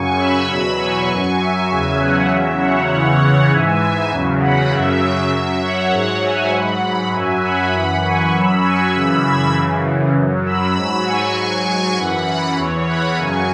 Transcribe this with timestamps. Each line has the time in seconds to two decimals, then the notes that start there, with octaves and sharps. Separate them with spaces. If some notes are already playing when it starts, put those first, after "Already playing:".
Already playing: F#2 C#3 F#3 G#5 C#6
0.17 B5 E6
0.48 E2 B2 F#3
0.77 G#5 C#6
1.08 F#2 F#3
1.39 E5 G#5
1.68 E2 C#3 F#3
1.99 C#5 F#5
2.29 E2 C#3 F#3 E5
2.59 C#5 F#5
2.90 E2 C#3 E3 C#5 F#5
3.19 C#5 F#5
3.50 G#2 E3 E5 G#5
3.80 E5 G#5
4.11 E2 C#3 F#3
4.41 F#5 B5
4.71 F#2 C#3 F#3 E5
5.31 F#2 F#3 E5
5.62 C#5 F#5
5.92 G#2 F#3
6.22 E5 G#5
6.52 G#2 F#3 F#5 B5
7.12 F#2 F#3 E5 G#5
7.43 F#5 B5
7.73 F#2 E3
8.03 G#5 C#6
8.33 F#2 F#3 B5 E6
8.64 G#5 C#6
8.94 F#2 C#3 E3 B5 E6
9.24 E6 G#6
9.55 F#2 C#3 E3
10.15 F#2 F#3
10.45 B5 E6
10.76 G#2 F#3
11.05 G#5 C#6
11.36 G#2 F#3
11.66 G#5 C#6
11.96 F#2 E3 F#5 B5
12.56 E2 E3 C#5
12.87 F#5 B5
13.17 F#2 C#3 F#3 G#5 C#6